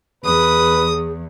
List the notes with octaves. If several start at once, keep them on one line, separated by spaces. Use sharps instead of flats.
E2 G#4 B4 D#6